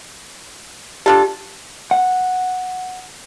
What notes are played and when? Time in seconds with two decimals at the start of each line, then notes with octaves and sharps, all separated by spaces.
1.06 D4 F4 G4 A4
1.91 F#5